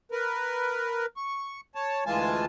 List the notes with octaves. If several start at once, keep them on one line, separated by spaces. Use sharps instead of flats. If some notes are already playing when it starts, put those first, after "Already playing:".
A#4 B4
C#6
C#5 A5
D2 E3 G#3 F4 G#5 A5